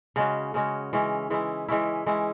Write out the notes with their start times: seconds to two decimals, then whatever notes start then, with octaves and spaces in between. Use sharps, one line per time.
0.16 C#3 G#3 C#4 F#4
0.54 C#3 G#3 C#4 F#4
0.93 E3 G#3 C#4 E4
1.30 E3 G#3 C#4 E4
1.68 E3 G#3 C#4 E4
2.06 E3 G#3 C#4 E4